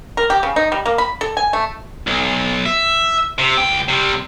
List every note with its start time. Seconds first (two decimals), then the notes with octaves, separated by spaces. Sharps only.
0.17 A#4
0.30 G4
0.43 C#3
0.56 D#4
0.72 G3
0.86 A#3
0.98 B5
1.21 A4
1.37 G#5
1.53 A3
2.07 B1
2.66 E5
3.38 C3
3.58 C#2 G5
3.89 C3 G3